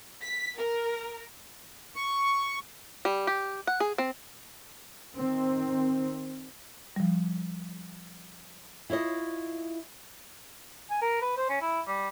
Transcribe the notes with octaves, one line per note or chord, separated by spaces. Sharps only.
B6
A#4
C#6
G3
G4
F#5
G#4
C4
D#3 C4
F3 G3
E4 F4 C#5 D#5
G#5
A#4
B4
C5
C#4
E4
G3